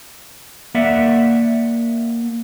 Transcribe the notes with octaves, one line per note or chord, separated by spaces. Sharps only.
A#3 D5 E5 F#5